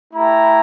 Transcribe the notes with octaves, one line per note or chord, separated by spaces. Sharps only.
A3 E4 G4 A#5